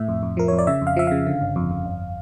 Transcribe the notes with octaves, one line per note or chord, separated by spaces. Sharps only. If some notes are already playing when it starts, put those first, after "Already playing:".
Already playing: A2 E5
F2
F2
F3 A#4
F2 C#5
D5
C#3 E5
F2
F5
F3 E5
C#3 F5
D3
G1
F2
F2
G1